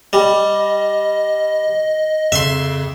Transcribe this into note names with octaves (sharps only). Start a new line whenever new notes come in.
G3 D#5
F2 C#3 E5 C6